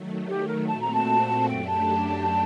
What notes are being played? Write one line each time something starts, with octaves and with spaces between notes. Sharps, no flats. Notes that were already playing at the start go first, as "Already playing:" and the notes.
Already playing: D#3 F#3 A3
G4
A#4
A#2 A3 C4 F#4 A5
A#5
A5
F#2 F#3 A3 D4 G4 G5
A5